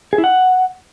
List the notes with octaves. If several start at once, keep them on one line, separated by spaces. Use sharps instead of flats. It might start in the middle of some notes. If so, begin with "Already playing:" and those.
G#4
E4
F#5